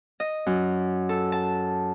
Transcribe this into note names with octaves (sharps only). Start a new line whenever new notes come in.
D#5
F#2
A4
A5